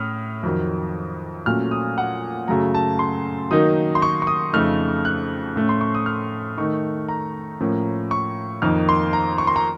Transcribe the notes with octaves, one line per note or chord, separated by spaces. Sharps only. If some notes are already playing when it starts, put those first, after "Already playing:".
Already playing: A2 C#4 D#6 F6
F2 D#3 F#3
A#2 F#3 A3 C#4 F6
D#6
F#5
F#2 C#3 F#3 A3 A#5
A5
C6
D#3 F#3 A#3 D#4 D#6
C6
C#6
C#6
D#6
F2 C#3 A3 D#4 F6
F#6
A2 A3 C#4
C6
C#6
D#6
F6
D#3 A3 D#4 C#6
A#5
A2 F3 A#3 C#4
C#6
F2 D#3 A#3 D#4 F6
C6
A#5
C#6
C6
A#5